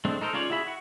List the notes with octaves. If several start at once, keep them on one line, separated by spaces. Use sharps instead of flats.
G#3 A3 C4 D4
D#4 A4 A#4 C5
G#3 C#4 F4 C#5 D5
E4 F#4 G#4 E5 B5
F#4 F#5